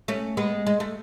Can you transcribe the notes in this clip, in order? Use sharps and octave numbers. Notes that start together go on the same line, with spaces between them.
A3 C#4
G#3 B3
G#3
A3